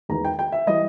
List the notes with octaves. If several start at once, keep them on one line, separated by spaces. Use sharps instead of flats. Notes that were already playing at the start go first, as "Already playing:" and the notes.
E2 D#3 G#3 B3 A#5
G5
G5
E5
E3 G3 D#5